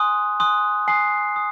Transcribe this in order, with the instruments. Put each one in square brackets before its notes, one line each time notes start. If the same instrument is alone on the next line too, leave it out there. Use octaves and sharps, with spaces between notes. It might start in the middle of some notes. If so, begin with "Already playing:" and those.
Already playing: [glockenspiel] G#5 C6 D#6 F#6
G#5 C6 D#6 F#6
G#5 C6 D#6 F#6 C7
D#6